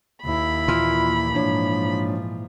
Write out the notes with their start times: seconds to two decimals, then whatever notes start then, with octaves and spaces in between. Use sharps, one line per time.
0.24 D#2 E4 B5
0.68 A#2 E3 F4 C6 F6
1.34 G#2 F3 A#3 D4 C#5